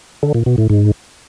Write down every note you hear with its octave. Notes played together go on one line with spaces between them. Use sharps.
D3
A#2
B2
A2
G#2